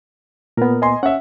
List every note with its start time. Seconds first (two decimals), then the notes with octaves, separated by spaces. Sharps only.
0.57 A#2 B3 A#4
0.82 D#5 G#5 C6
1.03 C#4 E5 F#5